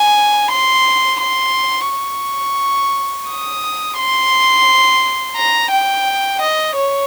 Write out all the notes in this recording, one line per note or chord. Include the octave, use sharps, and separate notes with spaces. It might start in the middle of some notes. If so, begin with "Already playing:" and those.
Already playing: G#5
C6
C6
C#6
D#6
C6
A#5
G5
D#5
C#5